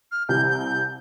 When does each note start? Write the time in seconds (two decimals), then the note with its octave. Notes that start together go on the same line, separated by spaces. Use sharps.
0.11 F6
0.29 C2 C3 E3 G6
0.49 G6